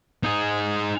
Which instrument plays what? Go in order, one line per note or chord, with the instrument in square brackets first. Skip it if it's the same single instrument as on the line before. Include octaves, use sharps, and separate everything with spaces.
[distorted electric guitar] D#4 G#4